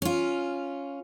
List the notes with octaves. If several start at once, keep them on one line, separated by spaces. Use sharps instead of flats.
C#4 F4